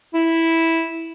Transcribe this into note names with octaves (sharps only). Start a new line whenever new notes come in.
E4